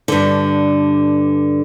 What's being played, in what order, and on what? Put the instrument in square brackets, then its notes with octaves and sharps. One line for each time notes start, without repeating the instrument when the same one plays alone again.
[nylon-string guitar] G2 D3